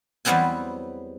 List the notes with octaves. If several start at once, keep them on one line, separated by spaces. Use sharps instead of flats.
E2 F#3 G3 B3 C4 G#5